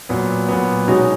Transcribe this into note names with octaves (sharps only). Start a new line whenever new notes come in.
A#2 F#3 B3
A#2 F#3 B3
B2 G#3 D#4 F#4 C#5